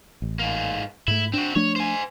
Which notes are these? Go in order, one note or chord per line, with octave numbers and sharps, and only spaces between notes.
A1
G#2 A#3
G#2 A3 E4
C4 D4 F#4
F3 A3 D4 C#5
C5 G#5